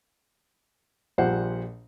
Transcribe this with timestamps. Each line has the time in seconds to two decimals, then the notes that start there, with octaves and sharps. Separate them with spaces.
1.18 A#1 F3 G3 C5 F#5